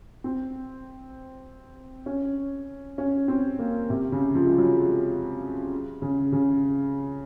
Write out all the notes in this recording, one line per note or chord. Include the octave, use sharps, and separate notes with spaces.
C4
C#4
C#4
C4
A#3
C3
C#3
F3
G#3
F#3
C#3
C#3